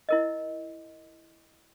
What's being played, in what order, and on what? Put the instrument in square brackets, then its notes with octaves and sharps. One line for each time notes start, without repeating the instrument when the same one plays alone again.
[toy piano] E4 A#4 D#5